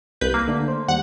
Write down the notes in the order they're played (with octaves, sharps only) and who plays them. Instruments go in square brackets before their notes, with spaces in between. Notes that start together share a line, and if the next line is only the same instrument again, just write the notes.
[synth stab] C2 B4 G6
A#3
[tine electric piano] D3 A3 D4
C5
[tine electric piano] D#2 G3 [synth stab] F#5